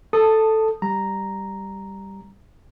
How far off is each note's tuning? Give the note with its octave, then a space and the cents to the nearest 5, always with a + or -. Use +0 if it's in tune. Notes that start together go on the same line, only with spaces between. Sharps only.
A4 +0 A5 +10 D#6 -10
G3 +0 A#5 +0